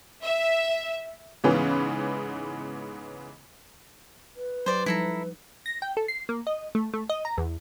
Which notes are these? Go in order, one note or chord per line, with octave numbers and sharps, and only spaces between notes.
E5
G#2 C#3 E3 B3 C#4
B4
F#3 D4 G4 C5 D5
F3 G3 D#4 E4 A4 A#5
A#6
G5
A4
C7
A#3
D#5
A3
A3
D#5
A#5
E2